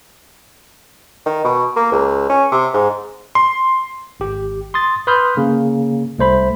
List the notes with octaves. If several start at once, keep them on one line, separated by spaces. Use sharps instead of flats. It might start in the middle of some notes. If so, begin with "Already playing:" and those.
D#3
B2
A#3
C#2
C#4
C3
G#2
C6
G#1 G4
C6 D#6 A6
B4 B5 C6 D#6 F6 G6
C#3 A#3
C2 A3 C5 B5